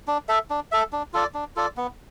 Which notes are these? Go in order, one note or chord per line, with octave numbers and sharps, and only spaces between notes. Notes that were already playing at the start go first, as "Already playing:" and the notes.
D4
A4 E5
D4
A4 E5
D4
F4 A4 D5
D4
F4 A4 D5
B3